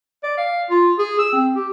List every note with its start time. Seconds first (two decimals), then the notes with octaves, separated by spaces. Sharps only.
0.24 D5
0.37 F5
0.71 F4
0.99 G#4
1.19 E6
1.33 C4
1.56 G4